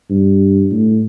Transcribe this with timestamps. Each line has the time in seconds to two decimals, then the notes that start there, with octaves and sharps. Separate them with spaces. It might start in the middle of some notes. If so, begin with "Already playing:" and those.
0.10 G2
0.71 A2